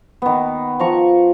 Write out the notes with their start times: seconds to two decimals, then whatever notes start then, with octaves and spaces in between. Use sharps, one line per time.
0.22 D#3 B3
0.79 F3 A#5 C#6